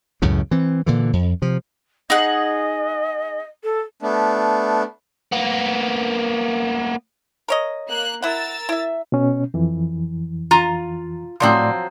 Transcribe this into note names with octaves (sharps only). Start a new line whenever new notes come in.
C#2 F#2 A2 C#3
E3 C4
A#2 D3 E3
F2
C3 F3
D#4 G#4 D#5 F#5
A4
A3 B3 D4
A#3 B3
A#4 C#5 D#5
A#3 F#6
E4 A#4 F#5 E6 A6
E4 E5
B2 C#4
F2 E3
F4 A#5
A2 F3 F#3 C4 D5 C6